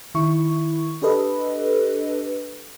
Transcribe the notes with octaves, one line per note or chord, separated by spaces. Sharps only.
D#3 E4 C#6
D4 G4 A4 B4 D#5